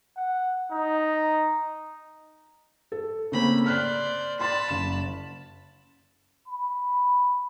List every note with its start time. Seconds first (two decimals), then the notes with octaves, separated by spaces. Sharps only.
0.16 F#5
0.72 D#4
2.92 A4
3.32 C#3 A3 A#3 C4 B5
3.66 C5 D5 F6 F#6 B6
4.40 D5 A5 B5 C6 A6
4.68 F#1 E7
6.48 B5